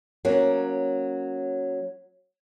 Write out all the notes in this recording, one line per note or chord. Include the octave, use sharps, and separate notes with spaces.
F#3 A#3 C#4